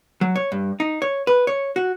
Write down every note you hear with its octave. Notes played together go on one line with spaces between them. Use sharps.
F#3
C#5
G2
D#4
C#5
B4
C#5
F#4